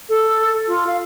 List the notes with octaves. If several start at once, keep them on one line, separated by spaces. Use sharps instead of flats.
A4
F4
F5